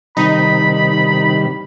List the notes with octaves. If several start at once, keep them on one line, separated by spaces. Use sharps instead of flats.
C3 D#3 G3 D#4 B5